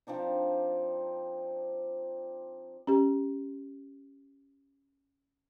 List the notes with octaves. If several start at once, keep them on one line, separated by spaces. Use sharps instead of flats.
F3 C4 D4 D#4
C#4 G4